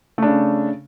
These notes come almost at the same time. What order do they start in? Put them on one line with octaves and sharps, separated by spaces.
A3 D4 C#3